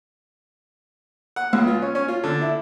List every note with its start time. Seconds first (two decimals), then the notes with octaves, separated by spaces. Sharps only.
1.36 F#5
1.53 C#2
1.67 F4
1.82 C#4
1.95 C#4
2.08 F4
2.23 D3
2.42 E4